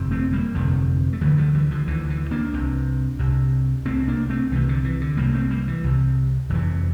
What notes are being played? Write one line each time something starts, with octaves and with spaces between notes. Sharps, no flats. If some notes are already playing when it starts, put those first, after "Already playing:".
Already playing: G1 F2 C3
A3 C4
G3 A#3
G1 F2 C3 F3 A3
A3
D2 D3 E3 G3
F3 A3
E3 G3
D3 F3
D2 D3 E3
E3
A#3 D4
C2 C3
C2 C3
C2 C3 A3 C4
A#3 D4
A3 C4
C2 C3 E3
D3
E3
D3
C2 C3 G3 A#3
A3 C4
G3 A#3
E3
C2 C3
F1 F2 C3 E3